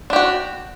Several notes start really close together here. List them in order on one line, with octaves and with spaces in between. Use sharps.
D4 G4 F#4